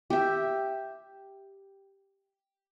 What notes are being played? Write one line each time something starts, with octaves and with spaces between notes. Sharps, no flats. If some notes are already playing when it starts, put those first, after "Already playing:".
G4 E5